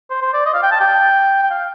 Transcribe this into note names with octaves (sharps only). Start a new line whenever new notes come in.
C5
C5
D5
D#5
F5
G5
A5
G5
G5
F5